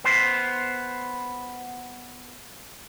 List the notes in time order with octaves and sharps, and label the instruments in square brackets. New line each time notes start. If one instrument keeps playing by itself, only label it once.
[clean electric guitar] B3 C5